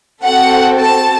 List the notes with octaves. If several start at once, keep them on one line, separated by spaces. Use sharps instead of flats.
C4 F#4 A4 F#5
A5